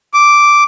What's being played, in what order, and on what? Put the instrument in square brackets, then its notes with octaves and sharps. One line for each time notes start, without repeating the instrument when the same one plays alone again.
[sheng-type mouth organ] D6